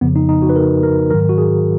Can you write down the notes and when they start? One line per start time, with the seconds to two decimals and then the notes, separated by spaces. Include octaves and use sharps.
0.01 F2 C#3 F3 B3
0.16 D#4
0.29 D#4
0.42 F#4
0.50 B4
0.56 A#4
0.83 A#4
1.11 G#2 D#3 F#3 A#4
1.29 F#4
1.38 G#4